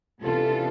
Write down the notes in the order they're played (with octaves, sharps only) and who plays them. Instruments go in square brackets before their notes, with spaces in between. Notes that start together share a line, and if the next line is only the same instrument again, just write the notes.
[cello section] C3 E3 B3 D4 F4 A4